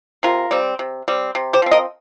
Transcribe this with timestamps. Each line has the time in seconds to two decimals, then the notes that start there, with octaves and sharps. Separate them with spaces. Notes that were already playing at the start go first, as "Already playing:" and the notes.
0.23 C3 F4 A#4
0.51 G3 C4
0.79 C3
1.08 G3 C4
1.35 C3
1.53 G4 C5
1.62 F3 C4
1.71 A#4 D#5